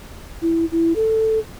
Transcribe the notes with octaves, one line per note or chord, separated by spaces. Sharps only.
E4
E4
A4